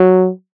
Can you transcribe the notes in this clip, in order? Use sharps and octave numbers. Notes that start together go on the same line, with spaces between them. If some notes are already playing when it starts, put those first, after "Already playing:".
Already playing: F#3